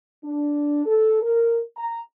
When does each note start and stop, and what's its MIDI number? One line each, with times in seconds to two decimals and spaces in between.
0.24 0.83 62
0.86 1.22 69
1.22 1.60 70
1.77 1.99 82